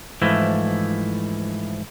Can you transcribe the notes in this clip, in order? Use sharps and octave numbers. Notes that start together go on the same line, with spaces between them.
G#2 E3 F3 A3 E4